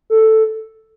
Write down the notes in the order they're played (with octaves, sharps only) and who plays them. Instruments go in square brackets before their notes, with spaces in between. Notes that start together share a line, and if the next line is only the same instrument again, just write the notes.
[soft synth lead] A4